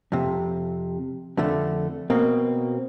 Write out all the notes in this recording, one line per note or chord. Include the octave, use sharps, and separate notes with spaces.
F2 C3
F2 D3 A3
B2 A#3 C4